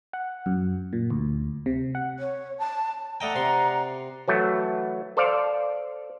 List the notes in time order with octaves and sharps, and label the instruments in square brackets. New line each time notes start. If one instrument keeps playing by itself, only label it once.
[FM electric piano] F#5
F#2
A#2
D2
C3
F#5
[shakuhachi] C#5
A5
[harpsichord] A3 D#5 G5 [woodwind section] D5 F#5 A#5
[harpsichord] C3 C6
[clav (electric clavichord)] E3 F#3 A3
A4 C5 D5 F5